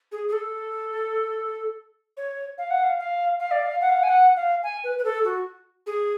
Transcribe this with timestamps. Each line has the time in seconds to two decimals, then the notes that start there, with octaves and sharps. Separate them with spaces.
0.12 G#4
0.28 G#4
0.33 A4
2.17 C#5
2.58 F5
2.70 F#5
2.83 F5
2.99 F5
3.40 F5
3.51 D5
3.63 F5
3.81 F#5
3.89 F5
3.98 F#5
4.03 G#5
4.09 F#5
4.36 F5
4.63 G#5
4.84 B4
4.99 B4
5.05 A4
5.24 F#4
5.86 G#4